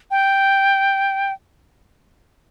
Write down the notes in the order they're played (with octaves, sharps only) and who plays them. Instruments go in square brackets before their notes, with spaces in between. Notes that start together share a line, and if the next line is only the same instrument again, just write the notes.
[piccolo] G5